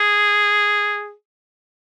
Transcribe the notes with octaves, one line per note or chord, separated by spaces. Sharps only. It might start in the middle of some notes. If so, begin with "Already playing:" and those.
Already playing: G#4